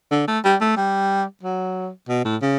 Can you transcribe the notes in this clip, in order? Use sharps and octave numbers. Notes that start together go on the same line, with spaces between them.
D3
A3
G3
A3
G3
F#3
B2
A2
C#3